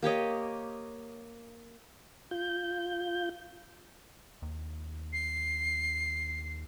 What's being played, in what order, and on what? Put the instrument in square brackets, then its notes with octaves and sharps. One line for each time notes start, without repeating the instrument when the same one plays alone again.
[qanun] A#3 G4 C#5 D#5
[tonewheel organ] F4 G6
[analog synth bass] D#2
[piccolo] C7